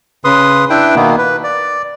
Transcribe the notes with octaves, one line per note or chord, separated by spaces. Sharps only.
C#3 B4 C6 D#6
D4 E4 B4 G5
B2 D#3 A#3 B3
B4
D5